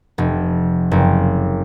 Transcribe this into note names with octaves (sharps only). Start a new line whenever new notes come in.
F1
F#1